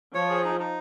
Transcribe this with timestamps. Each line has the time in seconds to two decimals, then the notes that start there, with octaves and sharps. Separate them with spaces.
0.14 F3 C#5
0.30 G#4
0.45 D#4
0.60 D#4